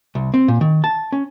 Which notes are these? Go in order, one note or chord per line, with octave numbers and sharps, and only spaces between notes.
C2
C4
A#2
D#3
A5
C#4